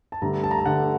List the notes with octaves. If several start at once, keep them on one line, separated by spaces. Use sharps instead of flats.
A5
G2 D3 A3 A#5
A5
A#5
A5
G2 D3 A3 F#5